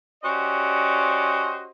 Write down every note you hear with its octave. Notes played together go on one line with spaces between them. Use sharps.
C#4 F#4 G4 C5 D5 D#5